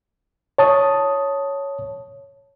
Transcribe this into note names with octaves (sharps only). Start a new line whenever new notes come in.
C#5 A5 D#6